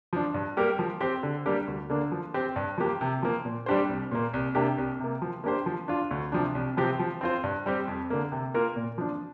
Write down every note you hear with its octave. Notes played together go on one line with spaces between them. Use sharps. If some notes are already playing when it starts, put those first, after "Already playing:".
F3 D4
G2
G3 A#3 G4 A#4
F3
C4 G4 C5
D3
G3 A#3 D4 G4
D2
D3 A#3 D4
F3
C4 G4
G2
F3 A#3 G4
C3
F3 A#3
A#2
G3 D4 G4 C5
C2
A#2 A#3
C2
C3 A#3 D4 G4
C2
C3 A#3
F3
A#3 D4 G4 C5
F3
D4 F4
D2
C3 F3 D4
C2
C3 F3 C4 G4
F3
C4 F4 C5
G2
G3 C4 G4
F2
D3 A#3
C3
A#3 F4 A#4
A#2
F3 D4